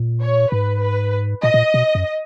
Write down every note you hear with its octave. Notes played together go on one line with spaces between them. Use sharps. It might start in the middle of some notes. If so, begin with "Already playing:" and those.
Already playing: A#2
C#5
G#2 B4
B4
A#2 D#5
A#2
B2
F#2